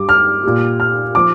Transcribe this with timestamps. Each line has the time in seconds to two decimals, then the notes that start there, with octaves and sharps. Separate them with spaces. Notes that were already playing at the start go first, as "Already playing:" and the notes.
Already playing: G2 G3 D6
0.09 F6
0.44 A#2 G3
0.80 F6
1.15 F3 D6